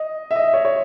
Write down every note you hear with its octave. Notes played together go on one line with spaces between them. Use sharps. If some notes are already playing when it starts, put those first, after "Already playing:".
Already playing: D#5
E5
D#5
C#5
C#5